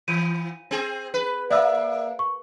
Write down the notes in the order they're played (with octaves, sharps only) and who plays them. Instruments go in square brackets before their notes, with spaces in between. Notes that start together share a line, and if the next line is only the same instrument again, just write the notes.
[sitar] E3 [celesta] D#7
[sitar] C4 G#4
B4
[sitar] A#3 [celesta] D5 E5 E6
[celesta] C#6